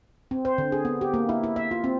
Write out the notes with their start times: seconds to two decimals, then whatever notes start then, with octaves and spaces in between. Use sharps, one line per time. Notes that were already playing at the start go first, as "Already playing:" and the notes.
0.31 C4
0.45 C5
0.58 D3
0.72 G#4
0.85 B3
1.01 G4
1.14 A#3
1.29 E4
1.43 E4
1.56 E5
1.71 F4
1.84 C4